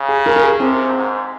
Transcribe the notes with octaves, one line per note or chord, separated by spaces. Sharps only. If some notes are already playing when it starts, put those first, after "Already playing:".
Already playing: C#3
G#4
A#4
A#4
G#4
C3 C4
G#2